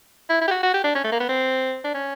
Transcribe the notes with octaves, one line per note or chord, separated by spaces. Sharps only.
E4
E4
G4
F#4
F#4
G4
D4
C#4
A3
A#3
B3
C4
D4
C#4